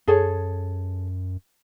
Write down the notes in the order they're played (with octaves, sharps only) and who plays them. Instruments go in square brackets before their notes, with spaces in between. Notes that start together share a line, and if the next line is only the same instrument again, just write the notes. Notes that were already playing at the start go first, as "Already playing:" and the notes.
[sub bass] F#2 [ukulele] G#4 A4 C#5